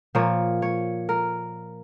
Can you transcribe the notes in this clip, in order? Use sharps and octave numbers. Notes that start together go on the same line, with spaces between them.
A#2 F3 A#3 C#5
C#5
A#4